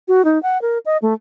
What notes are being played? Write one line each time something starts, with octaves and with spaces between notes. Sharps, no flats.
F#4
D#4
F#5
A#4
D#5
A3